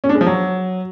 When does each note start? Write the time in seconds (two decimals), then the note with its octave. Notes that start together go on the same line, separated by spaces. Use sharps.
0.04 C#4
0.09 D4
0.15 G#3
0.21 F3
0.27 F#3